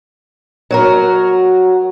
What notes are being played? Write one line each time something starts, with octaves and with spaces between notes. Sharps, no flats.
F#3 F#4 A#4